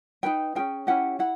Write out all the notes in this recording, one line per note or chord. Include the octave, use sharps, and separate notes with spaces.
D#4 G#4 B4 G5
C#4 F4 G#4 G5
C#4 E4 G4 F#5
E4 F#5